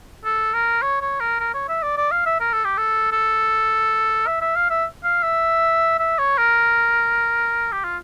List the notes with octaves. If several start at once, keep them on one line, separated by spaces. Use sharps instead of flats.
A4
A#4
C#5
C#5
A#4
A#4
C#5
E5
D5
D5
F5
E5
A#4
A4
G4
A4
A4
E5
E5
F5
E5
F5
E5
E5
C#5
A#4
G4
F4